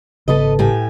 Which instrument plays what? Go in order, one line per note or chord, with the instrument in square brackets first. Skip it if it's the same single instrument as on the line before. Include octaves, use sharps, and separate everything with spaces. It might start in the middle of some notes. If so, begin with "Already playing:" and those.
[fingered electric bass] G#1 C#3 B3 [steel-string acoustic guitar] A4 B4 D#5
[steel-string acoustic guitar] A2 G4 G#5